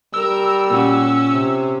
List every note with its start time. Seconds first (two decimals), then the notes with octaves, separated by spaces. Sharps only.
0.14 G3 A#4 E6
0.70 A#2 C#4 F#4
1.32 C3